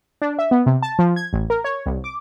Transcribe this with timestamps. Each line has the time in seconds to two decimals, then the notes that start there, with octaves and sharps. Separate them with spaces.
0.22 D4
0.39 E5
0.51 B3
0.66 C3
0.82 A5
0.99 F3
1.16 G#6
1.33 A1
1.50 A#4
1.64 C#5
1.86 C2
2.04 D6